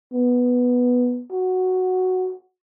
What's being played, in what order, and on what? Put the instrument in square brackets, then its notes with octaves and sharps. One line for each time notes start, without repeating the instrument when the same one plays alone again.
[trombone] B3
F#4